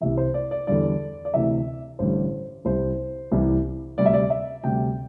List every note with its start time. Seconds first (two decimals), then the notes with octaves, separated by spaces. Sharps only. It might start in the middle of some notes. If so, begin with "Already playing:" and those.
0.01 C2 C3 E3 E5
0.17 C5
0.34 D5
0.51 D5
0.67 E2 D3 G3 D5
1.25 D5
1.34 D2 C3 E3 E5
1.99 A1 G2 D3 G3 C5
2.65 C2 C3 G3 C5
3.32 C2 C3 E3 G3
3.98 D2 C3 G3 D5
4.06 E5
4.14 D5
4.30 E5
4.64 D2 C3 G3 G5